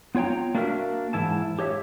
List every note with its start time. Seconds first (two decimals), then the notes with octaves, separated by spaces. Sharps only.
0.15 B3 F4 C#5 G5 A#5
0.55 A#3 D4 F#4 G4 A#4 E5
1.13 G#2 E3 E4 A5
1.59 G4 C#5 D#5 E5